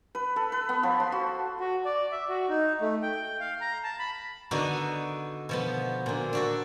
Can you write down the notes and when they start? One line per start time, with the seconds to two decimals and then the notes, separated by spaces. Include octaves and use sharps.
0.15 B4
0.36 A4
0.52 B4
0.69 B3
0.83 F3
1.00 C6
1.12 F#4
1.60 F#4
1.85 D5
2.12 E5
2.29 F#4
2.49 D#4
2.81 A3
3.03 G5
3.40 F5
3.61 A#5
3.84 A5
3.99 B5
4.51 D3 B3 D4 D#4 F#4
5.49 B2 F3 B3
6.06 A#2 D3
6.33 D4 F#4 A4